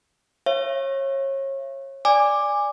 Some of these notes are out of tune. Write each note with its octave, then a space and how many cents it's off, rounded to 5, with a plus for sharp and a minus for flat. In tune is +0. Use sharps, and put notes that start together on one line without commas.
C#5 -30 E5 +40
D5 +0 G#5 -20 D6 +10